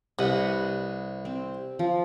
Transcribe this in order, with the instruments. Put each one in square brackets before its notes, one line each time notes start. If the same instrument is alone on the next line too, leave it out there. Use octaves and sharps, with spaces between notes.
[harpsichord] C2 [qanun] B4 D#5 F#5
[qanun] C4
F3